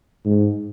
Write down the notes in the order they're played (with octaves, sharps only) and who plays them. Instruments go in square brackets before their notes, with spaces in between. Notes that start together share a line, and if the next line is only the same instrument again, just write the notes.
[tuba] G#2